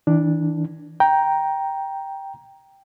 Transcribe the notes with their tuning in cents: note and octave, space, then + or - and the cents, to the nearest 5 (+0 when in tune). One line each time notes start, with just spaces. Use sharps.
E3 -35 D4 +0
G5 +0 A#5 +10